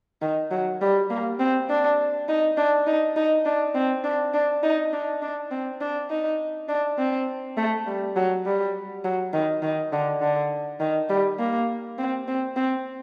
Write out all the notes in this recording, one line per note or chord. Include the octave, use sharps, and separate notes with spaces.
D#3
F#3
G3
A#3
C4
D4
D#4
D4
D#4
D#4
D4
C4
D4
D4
D#4
D4
D4
C4
D4
D#4
D4
C4
A3
G3
F#3
G3
F#3
D#3
D#3
D3
D3
D#3
G3
A#3
C4
C4
C4